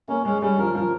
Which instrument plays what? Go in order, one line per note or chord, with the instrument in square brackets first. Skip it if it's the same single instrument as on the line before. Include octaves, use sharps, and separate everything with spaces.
[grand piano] A#3 [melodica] C#4
[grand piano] G#3 [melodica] C#4
[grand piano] G3 [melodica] C#4
[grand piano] F3 [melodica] A#4
[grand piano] F3 [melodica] A#4